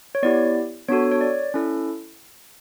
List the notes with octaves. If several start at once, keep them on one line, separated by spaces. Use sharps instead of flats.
C#5
B3 E4 G4 D5
B3 D4 F#4 A4 C#5
C#5
D5
C#4 E4 A4